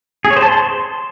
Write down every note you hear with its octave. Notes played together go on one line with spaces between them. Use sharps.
G#4
C#5
C5
A5
C6